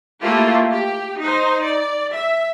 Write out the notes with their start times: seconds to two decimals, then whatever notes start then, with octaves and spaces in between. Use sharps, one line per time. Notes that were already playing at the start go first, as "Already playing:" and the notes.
0.22 A3 A#3 E4 F4 G4
0.71 G4
1.19 D#4 C5
1.62 D5
2.13 E5